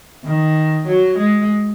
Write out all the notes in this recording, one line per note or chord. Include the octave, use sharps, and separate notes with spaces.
D#3
F#3
G#3